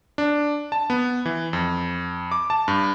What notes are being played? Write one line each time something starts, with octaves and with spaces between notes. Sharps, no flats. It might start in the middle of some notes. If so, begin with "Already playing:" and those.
D4
A5
B3
E3
F2
D6
A5
G2